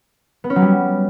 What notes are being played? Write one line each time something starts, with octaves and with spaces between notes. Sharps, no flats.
B3
C#4
F#3
G3